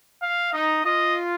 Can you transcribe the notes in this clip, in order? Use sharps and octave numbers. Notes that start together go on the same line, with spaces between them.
F5
D#4 D#5
F4 D#5